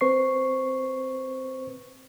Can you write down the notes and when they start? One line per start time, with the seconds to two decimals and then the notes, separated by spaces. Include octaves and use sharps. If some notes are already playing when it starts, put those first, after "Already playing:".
0.01 C4 B4 C5 C#6 C7